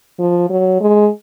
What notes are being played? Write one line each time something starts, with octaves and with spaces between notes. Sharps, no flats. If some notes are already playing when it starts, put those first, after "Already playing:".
F3
F#3
G#3